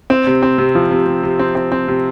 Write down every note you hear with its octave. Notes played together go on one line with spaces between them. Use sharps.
C4
C3
C4
C3
F3
C3
C3
C3
C4
C4
C4
C3